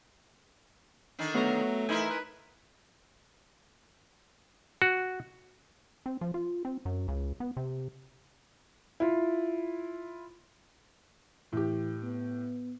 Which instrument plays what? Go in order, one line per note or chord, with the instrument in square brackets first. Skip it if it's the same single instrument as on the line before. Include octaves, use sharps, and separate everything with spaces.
[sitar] D3 D#3 D4
[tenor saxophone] F#3 [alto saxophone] A3 [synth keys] B3 F#4 A#5
[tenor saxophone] E3 [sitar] D#4 E4 A#4 [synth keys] G#5 B5 C6
[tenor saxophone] B4
[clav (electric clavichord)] F#4
[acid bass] C4
F3
F4
C4
F#2
C#2
B3
C3
[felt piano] E4 F4
[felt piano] A2 G4 [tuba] E3
[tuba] B3